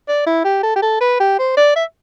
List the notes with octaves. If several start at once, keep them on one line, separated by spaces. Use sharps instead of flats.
D5
E4
G4
A4
G4
A4
B4
G4
C5
D5
E5